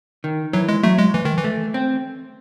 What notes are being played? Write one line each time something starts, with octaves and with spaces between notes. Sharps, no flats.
D#3
E3 F#3
G#3
F#3 A3
G#3
E3
D#3
E3
A3
C4